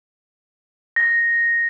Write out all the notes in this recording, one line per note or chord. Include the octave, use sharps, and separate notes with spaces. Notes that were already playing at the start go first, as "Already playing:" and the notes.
A#6